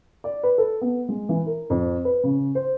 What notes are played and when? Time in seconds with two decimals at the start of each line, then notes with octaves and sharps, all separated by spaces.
0.24 D5
0.43 B4
0.58 A4
0.81 B3
1.09 G#3
1.29 E3
1.46 A#4
1.70 F2
2.05 B4
2.23 C#3
2.55 C5